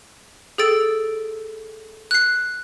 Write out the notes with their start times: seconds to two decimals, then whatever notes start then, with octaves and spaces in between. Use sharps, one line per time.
0.58 G#4 A4 E6 A6 D7
2.11 F#6 C7